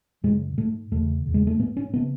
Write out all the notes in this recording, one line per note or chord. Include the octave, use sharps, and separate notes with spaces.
F#2 C#3 G#3
G#2 A3
E2 C#3 A3
E2 C#3
G#3
A3
G#2 B3
C#4
C#3 B3